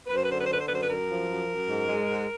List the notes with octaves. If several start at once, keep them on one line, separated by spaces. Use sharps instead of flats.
F#2 B4
C5
B4
D3 C5
B4
C5
D3 B4
C5
F#2 B4
C5
B4
F#2 A#4
F3
F#2
F#2
G#2
G#3
G#2